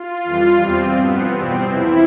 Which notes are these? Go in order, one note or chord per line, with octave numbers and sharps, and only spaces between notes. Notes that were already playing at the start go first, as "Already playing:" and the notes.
Already playing: F4
F2 E3 G3
E2 B2 G3 C4
G2 F3 B3
E2 B2 G3 C4
E2 C3 F3 E4